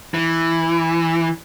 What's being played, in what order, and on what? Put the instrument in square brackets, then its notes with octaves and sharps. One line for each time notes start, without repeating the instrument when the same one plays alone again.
[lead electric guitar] E3